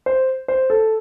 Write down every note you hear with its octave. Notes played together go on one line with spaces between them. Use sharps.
C5
C5
A4